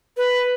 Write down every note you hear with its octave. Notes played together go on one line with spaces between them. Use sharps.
B4